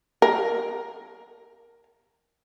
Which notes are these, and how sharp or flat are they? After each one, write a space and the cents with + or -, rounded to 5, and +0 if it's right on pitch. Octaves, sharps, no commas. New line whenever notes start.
A#4 +0